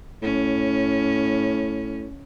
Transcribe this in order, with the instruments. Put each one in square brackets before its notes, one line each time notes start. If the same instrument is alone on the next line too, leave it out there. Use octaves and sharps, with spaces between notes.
[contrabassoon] A2 [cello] C#4